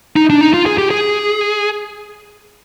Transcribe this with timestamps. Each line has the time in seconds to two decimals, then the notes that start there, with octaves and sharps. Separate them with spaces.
0.16 D#4
0.30 D4
0.41 D#4
0.54 F4
0.66 G#4
0.78 G4
0.91 G#4